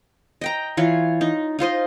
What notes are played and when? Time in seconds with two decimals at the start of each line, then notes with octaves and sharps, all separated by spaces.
0.41 D#5 G5 A#5
0.77 E3 F4 C#5
1.21 D#4
1.59 D#4 F4 C5 D#5